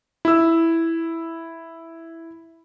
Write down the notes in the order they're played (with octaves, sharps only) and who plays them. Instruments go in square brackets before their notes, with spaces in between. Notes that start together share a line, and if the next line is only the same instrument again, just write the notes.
[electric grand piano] E4 E6